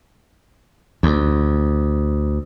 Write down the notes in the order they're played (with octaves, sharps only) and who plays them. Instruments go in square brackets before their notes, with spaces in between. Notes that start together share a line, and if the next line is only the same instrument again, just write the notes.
[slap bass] D2